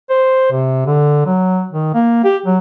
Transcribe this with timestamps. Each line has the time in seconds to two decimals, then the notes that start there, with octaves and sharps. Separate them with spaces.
0.10 C5
0.52 C3
0.86 D3
1.26 F#3
1.71 D#3
1.94 A#3
2.24 G4
2.46 F#3